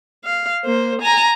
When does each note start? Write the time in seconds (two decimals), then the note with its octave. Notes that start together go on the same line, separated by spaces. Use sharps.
0.25 F5
0.65 A#3 C5
1.02 G#5 A#5